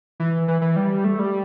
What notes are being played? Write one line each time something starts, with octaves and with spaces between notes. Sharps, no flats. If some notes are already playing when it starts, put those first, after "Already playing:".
E3
E3
E3
G3
A3
G3